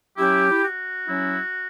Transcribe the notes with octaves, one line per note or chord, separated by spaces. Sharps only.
F#3 C#4 E4 G4
E4
F#4
F#3 C#4 E4